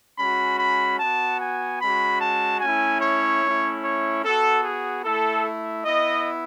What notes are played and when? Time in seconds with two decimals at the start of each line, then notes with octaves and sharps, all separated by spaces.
0.19 G#3 C#4 F#4 B5
0.59 B5
1.00 B3 F#4 A5
1.40 G#5
1.81 G#3 C#4 F#4 B5
2.21 A5
2.61 A3 C#4 E4 G#5
3.01 C#5
3.43 A3 C#4 E4
3.82 C#5
4.24 B3 F#4 A4
4.64 G#4
5.04 A3 E4 A4
5.85 B3 E4 D#5